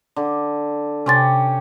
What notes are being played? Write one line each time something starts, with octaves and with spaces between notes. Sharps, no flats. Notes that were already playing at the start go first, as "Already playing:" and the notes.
D3
C3 C#4 G4 C6 A6